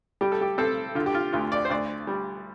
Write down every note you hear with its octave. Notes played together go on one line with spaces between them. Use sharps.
G3 G4
A4
G4
C4 A4
D3 F4
G4
F4
D2 F4
D5
C5
D2 D5
G3